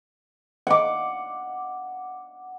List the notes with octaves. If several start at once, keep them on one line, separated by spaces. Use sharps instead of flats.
F#5 D6